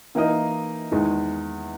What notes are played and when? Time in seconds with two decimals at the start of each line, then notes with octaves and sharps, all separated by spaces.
0.15 E3 A#3 D#4 A#4 D#5
0.92 E2 D#3 G#3